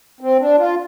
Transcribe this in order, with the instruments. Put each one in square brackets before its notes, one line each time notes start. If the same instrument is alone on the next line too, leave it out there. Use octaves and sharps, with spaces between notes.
[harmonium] C4
D4
F4